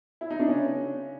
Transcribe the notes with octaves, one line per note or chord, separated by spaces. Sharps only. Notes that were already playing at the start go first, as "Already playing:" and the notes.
E4
D#4
D4
C#3 C#4